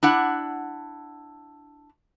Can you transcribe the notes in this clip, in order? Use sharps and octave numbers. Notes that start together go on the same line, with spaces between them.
D4 E4 F#5